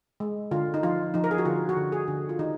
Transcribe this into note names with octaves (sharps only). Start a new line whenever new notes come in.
G#3
D3 F4
D#4
F3 F4
F3 D#4
A#4
G#4
F#4
D3 F4
F#4
D3
G#4
D3
F4
D#3 D#4